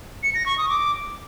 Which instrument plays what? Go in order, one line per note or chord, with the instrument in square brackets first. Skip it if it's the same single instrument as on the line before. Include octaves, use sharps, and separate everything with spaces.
[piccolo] C#7
A#6
C#6
D#6
D6